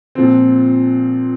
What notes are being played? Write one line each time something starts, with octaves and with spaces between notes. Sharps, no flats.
A#2 F3 C4